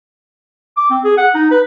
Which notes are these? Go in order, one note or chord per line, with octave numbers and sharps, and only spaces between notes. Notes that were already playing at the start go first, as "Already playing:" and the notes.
D6
C4
G#4
F#5
D#4
B4